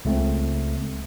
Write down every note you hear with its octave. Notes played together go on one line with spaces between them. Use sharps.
C#2 A3 C4